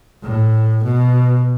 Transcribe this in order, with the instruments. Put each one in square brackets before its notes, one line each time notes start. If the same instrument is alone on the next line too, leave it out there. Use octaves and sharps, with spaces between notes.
[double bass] A2
B2